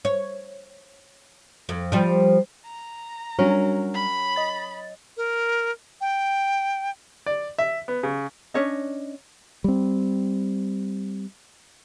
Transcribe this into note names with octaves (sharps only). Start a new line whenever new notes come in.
C#5
F2
F3 G3
A#5
F#3 G3 C#4 D4 A#4
B5
D#5 A6
A#4
G5
D5
E5
B3
C#3
C#4 D4 C#5 D#5
G3 C4